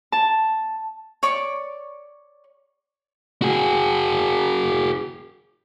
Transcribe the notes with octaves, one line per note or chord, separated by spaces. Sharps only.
A5
C#5 D5 C#6 D6
F#4 G#4